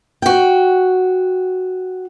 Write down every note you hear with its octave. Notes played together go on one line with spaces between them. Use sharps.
F#4 G5